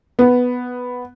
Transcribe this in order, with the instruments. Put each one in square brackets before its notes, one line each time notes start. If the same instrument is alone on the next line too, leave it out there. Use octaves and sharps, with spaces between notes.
[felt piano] B3